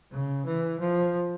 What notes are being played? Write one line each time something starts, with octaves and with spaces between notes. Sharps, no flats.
C#3
E3
F3